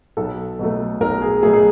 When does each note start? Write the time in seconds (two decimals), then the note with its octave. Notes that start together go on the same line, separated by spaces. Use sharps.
0.17 B1 A4
0.59 B2 F#3 A3
1.01 B1 A#4
1.22 G#4
1.43 B2 F#3 A3 G#4
1.54 G#4